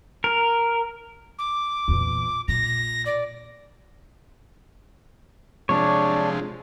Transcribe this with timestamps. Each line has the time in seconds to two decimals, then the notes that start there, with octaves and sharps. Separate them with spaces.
0.24 A#4
1.39 D6
1.88 E2 A#2
2.48 A#2 A#6
3.06 D5
5.69 C3 F3 G#3 D4 C#5